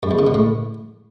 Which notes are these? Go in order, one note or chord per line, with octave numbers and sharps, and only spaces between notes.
F#2
E2
C#3
B2
A2